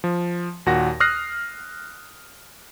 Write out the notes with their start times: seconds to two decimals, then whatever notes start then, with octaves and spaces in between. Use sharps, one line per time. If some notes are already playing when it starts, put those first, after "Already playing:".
0.04 F3
0.66 D#2 A#2 F#4 A#6
1.00 D#6 F6 F#6 A#6 C7